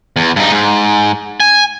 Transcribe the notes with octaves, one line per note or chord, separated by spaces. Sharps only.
E2
G2 D#4
G#2
G#5